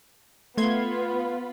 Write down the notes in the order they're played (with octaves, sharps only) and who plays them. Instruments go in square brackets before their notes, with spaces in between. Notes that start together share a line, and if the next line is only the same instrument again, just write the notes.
[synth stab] A3 C6 G#6 [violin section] B3 F4 B5